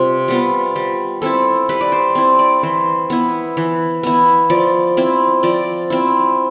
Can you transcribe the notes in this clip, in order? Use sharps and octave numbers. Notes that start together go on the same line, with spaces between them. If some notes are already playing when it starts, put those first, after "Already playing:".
Already playing: C3 G3 F4
G3 B3 F4
G3
C4 E4 A4
G3 B4
D5
C5
C4 E4
D5
E3 C5
B3 E4
E3
B3 E4
F3 D5
C4 E4
F3 D5
C4 E4